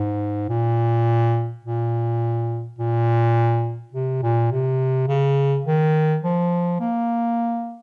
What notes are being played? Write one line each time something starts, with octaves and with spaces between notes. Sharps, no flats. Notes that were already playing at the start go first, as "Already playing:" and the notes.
Already playing: G#2
A#2
A#2
A#2
C3
A#2
C3
C#3
D#3
F3
A#3